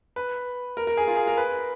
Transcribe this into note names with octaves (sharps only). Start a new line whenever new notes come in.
B4
A#4
A#4
G#4
F4
G#4
A#4
B4